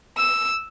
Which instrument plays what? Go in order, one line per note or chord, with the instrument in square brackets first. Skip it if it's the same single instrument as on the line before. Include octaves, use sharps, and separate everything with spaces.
[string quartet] E6